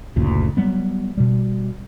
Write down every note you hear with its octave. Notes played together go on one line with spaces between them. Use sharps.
F#1 D2 A#2
F#3 G3 B3
B2 G3